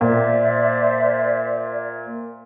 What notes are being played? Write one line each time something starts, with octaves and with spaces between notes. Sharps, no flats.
A#2 C5 D5 E5